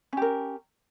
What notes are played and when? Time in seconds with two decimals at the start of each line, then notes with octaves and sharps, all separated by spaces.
0.13 C#4
0.17 G4
0.22 A#4